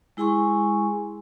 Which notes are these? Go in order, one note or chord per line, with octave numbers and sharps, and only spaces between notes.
G#3 E4 G#4 G#5 C6 C#6